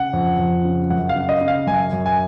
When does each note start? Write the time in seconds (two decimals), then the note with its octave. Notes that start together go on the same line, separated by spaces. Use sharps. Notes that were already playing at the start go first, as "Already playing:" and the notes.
Already playing: C#3 F#5
0.13 F2
0.39 F2
0.65 C#3
0.90 F#2 F#5
1.09 F5
1.16 C#3
1.29 D#5
1.41 C#3
1.48 F5
1.67 F#2 G#5
1.93 F#2
2.06 G#5